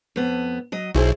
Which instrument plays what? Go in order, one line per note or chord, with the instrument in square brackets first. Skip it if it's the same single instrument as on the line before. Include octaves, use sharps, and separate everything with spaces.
[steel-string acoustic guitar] F2 B3
F#3 D#5
[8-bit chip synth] B1 [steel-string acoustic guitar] E4 G#4 C5